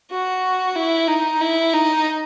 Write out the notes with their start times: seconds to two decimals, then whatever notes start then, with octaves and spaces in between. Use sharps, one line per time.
0.11 F#4
0.76 E4
1.08 D#4
1.41 E4
1.73 D#4